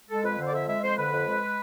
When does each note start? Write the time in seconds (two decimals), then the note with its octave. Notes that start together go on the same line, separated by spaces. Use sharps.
0.09 G#3 A4
0.24 F2 B4
0.39 D3 C5
0.46 D5
0.53 F2 E5
0.68 G#3 E5
0.82 F2 C5
0.97 D3 B4
1.12 F2
1.27 G#3